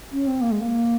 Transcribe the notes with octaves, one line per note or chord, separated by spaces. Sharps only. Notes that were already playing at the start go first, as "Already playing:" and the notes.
C#4
C4
A#3
G#3
A#3